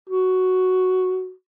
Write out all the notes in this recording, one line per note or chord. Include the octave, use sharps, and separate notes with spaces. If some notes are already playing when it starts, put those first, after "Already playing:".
F#4